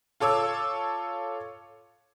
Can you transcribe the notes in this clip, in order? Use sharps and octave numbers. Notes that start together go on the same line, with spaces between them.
F4 A4 C#5 D6 E6